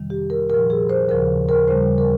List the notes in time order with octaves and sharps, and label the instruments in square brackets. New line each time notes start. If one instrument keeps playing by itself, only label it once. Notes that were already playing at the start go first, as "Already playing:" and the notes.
Already playing: [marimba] F2 C3 D#3 G3
G4
A#4
A#2 F3 A#4
G#4
C5
D#2 C#3 F3 A#4
A#4
D#2 C#3 G3 C5
A#4